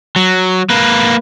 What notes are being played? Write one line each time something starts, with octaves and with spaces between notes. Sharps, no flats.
F#3
A#3 B4